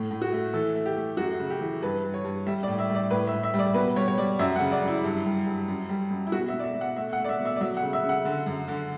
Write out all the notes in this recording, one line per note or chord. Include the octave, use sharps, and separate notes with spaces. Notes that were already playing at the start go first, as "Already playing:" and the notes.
Already playing: A2 A3
A2
F#4
A3
E3 A4
A3
G4
A3
F#2 F#4
C#3
G4
E3
G2 B4
G2
C#5
G2
G3 E5
D5
A2
E5
G3
D5
A2 B4
E5
A2
E5
G3
D5
B2 B4
G3 C#5
C#5
G3 D5
F#2 E5
F#5
C#3
D5
F#2
E4
G2
G3
G2
F#2
G3
F#2
E4
B2 F#4
E5
B2
D5
E5
B2
F#5
A3 E5
F#5
A3
D5
E5
B2
E5
D5
F#3 E5
F#5
C#3
E5
C#3
F#5
D3
F#2
D3